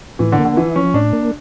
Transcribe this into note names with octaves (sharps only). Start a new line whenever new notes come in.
A2 E3
D3
A#3
D3
E3 E4
F3 C#4
A2 D4
A#3